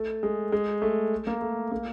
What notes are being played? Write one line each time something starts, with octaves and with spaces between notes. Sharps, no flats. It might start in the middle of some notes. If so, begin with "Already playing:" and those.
Already playing: A3
G#3
G#3
A3
A#3
A3
A#3